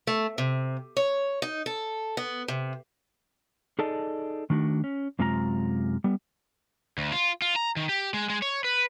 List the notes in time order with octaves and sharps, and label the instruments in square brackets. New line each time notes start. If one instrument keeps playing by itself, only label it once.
[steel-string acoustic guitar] A3
C3
C#5
D#4
A4
B3
C3
[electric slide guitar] D#4 G#4 A4 D5 D#5 A5
D#3 A3 D4 F#4
C#4
F#2 C3 G#3 F4 F#4 A#5
G3 B3
[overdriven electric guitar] D2
F4
F4
A#5
D#3
G4
G#3
G#3
C#5
B4